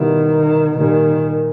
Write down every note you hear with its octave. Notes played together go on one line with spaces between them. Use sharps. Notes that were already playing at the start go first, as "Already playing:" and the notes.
Already playing: B2 D#3 G3 B3 E4
A#2 D#3 G3 A#3